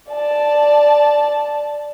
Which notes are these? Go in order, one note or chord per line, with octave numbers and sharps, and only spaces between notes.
D5 A5